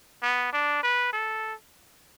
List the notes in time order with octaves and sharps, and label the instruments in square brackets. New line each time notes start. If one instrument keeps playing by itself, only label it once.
[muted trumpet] B3
D4
B4
A4